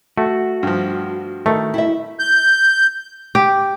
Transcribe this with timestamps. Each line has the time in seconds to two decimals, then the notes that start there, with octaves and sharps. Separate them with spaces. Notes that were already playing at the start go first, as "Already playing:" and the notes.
0.18 A3 F#4
0.63 G2 F3
1.46 D#3 A3
1.74 E4 E5
2.20 G6
3.35 G4